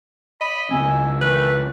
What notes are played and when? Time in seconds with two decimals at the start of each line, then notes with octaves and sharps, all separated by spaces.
0.41 D#5 B5
0.71 C#2 C#3 C4 G#5 E6
1.21 D#3 E3 A3 B4